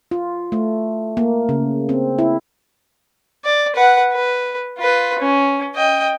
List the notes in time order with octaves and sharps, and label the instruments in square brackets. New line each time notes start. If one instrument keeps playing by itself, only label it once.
[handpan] F4
A3
A#3
C#3
C4
E4
[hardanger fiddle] D5
B4 F#5
B4
F4 B4
C#4
D#5 G5